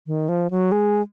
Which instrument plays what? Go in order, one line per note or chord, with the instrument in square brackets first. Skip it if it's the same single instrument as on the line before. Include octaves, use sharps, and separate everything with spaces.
[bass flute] D#3
F3
F#3
G#3